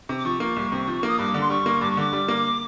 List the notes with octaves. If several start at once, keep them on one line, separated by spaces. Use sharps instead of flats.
C3
D6
F3 C#6
A#3
C2
C3
F3
A#3 D#6
G2 D6
D3
C6
G3 C#6
A#3
G2 D6
C#6
D3 D6
G3
A#3